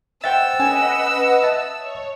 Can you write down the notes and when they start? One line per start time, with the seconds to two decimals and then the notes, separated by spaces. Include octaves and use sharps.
0.24 C5 E5 F#5 G5 E6 A6
0.60 C#4 A4 B4 D#5 F#5 G#5
1.43 D#5 E5 A5
1.78 C#5